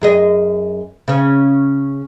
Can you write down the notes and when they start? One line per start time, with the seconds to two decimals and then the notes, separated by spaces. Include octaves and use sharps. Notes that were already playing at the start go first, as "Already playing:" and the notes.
0.01 F#2 G#4 D#5
1.08 C#3 C#4